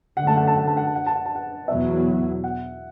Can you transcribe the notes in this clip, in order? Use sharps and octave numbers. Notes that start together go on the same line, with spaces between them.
F#2 D3 A3 F#5
A5
F#5
A5
F#5
A5
F#5
A5
F#5
A5
F#5
A5
F#5
E2 B2 F#3 B3 E5
F#5